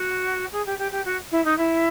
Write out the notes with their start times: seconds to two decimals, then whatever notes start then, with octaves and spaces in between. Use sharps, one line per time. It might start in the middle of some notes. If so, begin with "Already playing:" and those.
Already playing: F#4
0.52 G#4
0.65 G4
0.78 G4
0.91 G4
1.04 F#4
1.31 E4
1.44 D#4
1.57 E4